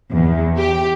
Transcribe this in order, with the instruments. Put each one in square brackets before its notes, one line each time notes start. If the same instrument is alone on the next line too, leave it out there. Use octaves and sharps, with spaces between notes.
[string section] E2
G4